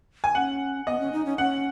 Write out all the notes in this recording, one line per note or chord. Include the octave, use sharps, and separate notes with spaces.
G#5
C#4 F#5
B3 D#5
C#4
D#4
C#4
C#4 F#5